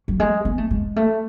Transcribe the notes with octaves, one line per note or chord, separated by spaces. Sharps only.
F#3
G#3
B3
A3
G#3
A3